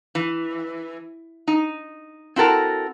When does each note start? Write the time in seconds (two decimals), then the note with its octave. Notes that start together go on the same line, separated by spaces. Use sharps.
0.15 E3
1.48 D#4
2.36 C4 E4 F#4 A4 A#4